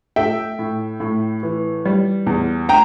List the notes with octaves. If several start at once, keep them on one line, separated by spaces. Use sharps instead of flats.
A3 E5 G5
A2
A2
E3
G3
E2
G5 A#5